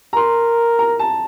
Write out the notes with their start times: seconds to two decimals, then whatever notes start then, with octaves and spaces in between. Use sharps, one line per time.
0.13 A#5
0.17 A#4 C6
0.79 A#5
0.99 A5